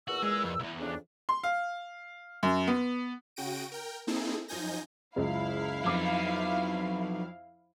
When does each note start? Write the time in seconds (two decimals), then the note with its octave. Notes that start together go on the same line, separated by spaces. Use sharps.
0.08 E2 A#2 F#4 E6
0.23 G#3
0.43 F2
0.59 B1 E2
0.79 F2 C#3 D4
1.29 C6
1.43 F5
2.43 F#2
2.67 B3
3.36 C#3 F#4 G5 A#6 D7 D#7
3.71 A#4 G5
4.07 A#3 C4 D#4 E4 G#4 A4
4.48 F#2 F3 D#4 G#5 G6 A#6
5.16 F#1 C#2 E4 F5
5.85 F2 F#3 D#4 D6